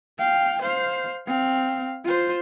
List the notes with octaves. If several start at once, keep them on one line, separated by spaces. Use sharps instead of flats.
F5 G5
C5 F5
C4 F5
F4 C5